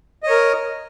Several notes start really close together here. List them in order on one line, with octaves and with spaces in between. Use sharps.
D#5 C#5 A#4